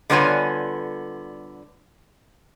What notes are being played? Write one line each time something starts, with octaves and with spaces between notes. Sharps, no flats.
D3 G3 B3 F4 C#5 G#5